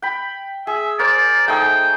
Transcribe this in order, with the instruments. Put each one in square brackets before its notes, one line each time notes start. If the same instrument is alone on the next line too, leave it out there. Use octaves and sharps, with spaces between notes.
[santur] G5 B5
[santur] G#4 [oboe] E5
[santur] A#4 C5 [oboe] D5
[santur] A3 D#4 G#4 [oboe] G5